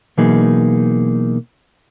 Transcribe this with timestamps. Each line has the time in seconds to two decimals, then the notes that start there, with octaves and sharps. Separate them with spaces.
0.18 B2 E3 F#3 A#3 D#4 G#4